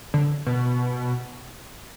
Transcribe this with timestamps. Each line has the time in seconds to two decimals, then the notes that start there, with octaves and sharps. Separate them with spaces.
0.14 D3
0.46 B2